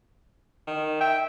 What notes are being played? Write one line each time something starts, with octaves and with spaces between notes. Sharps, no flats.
D#3
E5 G5